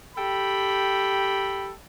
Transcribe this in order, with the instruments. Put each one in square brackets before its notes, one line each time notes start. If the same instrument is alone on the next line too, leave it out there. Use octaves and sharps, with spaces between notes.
[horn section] G4 A4 G5 B5